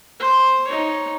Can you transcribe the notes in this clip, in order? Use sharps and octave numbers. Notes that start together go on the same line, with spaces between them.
C5
D#4 C#5